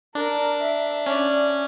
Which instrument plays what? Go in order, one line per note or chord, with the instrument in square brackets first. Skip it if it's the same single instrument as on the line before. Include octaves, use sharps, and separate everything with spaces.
[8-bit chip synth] D4 [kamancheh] A#4
[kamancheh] E5
[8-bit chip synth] C#4 [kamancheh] D5